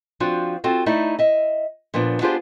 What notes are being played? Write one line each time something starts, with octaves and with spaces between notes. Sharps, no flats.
F3 C4 D4 F4 F#4
C4 F4 F#4 A4
A3 D#4 E4 D5
D#5 E5
A#2 F3 B3 D4
B3 D4 F4 G4 G#4 C5